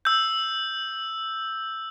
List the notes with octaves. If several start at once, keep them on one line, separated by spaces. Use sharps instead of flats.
E6 G6